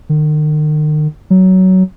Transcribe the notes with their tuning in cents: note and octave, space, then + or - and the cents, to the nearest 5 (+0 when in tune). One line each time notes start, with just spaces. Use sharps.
D#3 -40
F#3 +15